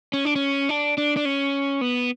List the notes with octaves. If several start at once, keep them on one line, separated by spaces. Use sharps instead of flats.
C#4
D4
C#4
D4
D4
D4
C#4
B3